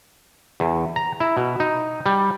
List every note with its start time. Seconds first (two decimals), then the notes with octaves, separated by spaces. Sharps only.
0.60 E2
0.96 A#5
1.20 E4
1.37 B2
1.60 D#4
2.06 G3